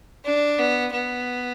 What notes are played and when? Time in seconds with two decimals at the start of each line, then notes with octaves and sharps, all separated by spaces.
0.25 D4
0.59 B3
0.93 B3